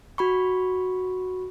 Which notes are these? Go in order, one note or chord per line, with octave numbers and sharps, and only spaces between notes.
F#4 B5 C#6